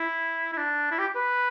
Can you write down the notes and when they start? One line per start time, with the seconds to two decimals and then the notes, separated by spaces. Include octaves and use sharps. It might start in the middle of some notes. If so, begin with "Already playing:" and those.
Already playing: E4
0.53 E4
0.57 D4
0.91 E4
0.99 G4
1.15 B4